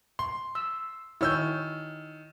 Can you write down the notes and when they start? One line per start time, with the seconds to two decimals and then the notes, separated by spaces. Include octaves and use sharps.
0.19 C6
0.55 E6
1.21 D#3 E4 C#5 E6 G6